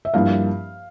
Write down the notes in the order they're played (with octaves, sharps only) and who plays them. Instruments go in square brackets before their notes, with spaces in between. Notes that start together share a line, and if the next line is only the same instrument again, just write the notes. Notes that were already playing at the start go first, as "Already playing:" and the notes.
[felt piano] E5
[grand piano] G2 F3 A#3 E4 [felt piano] F5